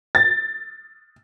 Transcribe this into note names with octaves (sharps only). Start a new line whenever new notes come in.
A6